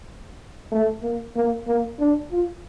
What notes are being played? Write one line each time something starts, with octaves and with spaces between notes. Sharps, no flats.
A3
A#3
A#3
A#3
D4
F4